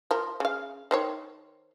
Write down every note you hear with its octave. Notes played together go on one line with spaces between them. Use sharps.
F3 A#4
C#3 F5
D#3 C5 C#5